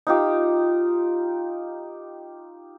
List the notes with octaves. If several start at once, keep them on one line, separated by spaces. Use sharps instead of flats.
D#4 F4 G4